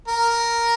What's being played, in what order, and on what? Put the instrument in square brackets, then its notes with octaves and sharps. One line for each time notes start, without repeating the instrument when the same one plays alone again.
[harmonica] A#4